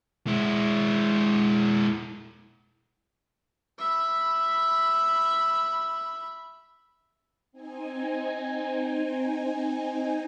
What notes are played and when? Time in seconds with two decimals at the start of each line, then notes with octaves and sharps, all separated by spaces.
0.27 G#3 E4
3.79 E5 B5
7.52 C4 D#4 G#5